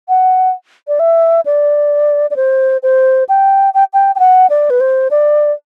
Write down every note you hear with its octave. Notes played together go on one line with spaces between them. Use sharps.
F#5
D5
E5
D5
D5
C5
C5
G5
G5
G5
G5
F#5
D5
B4
C5
D5